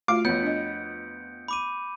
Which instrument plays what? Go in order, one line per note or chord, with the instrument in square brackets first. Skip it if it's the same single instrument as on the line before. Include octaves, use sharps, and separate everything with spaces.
[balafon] A3 F4 F#4 [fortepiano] F5 D6 [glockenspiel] D7
[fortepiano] F2 B3 [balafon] C#5 [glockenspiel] G6 C#7
[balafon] D4 D#5
[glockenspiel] B5 D6 D#7